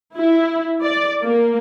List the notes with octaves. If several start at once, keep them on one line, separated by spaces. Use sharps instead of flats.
E4
D5
A#3